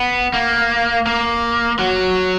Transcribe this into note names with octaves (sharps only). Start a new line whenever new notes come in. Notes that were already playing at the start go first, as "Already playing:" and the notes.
Already playing: B3
A#3
A#3
F#3